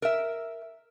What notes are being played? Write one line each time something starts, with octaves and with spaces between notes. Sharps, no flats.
A#4 E5